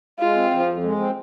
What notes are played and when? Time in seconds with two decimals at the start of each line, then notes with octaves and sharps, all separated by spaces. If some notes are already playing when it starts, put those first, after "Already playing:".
0.20 G#3 F4
0.35 C4
0.51 F3
0.67 F2
0.83 G#3
0.99 C4